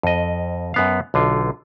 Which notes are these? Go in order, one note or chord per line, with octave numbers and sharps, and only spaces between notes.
F2 D#5
F#2 B3 F5
B1 D3 F4